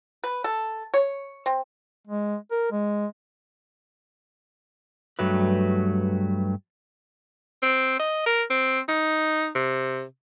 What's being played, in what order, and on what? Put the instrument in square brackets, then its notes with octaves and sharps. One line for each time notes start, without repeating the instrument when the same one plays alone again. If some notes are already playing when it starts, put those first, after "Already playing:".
[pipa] B4
A4
C#5
C4
[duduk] G#3
A#4
G#3
[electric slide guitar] G2 F#3 A3 B4
[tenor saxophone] C4
D#5
A#4
C4
D#4
C3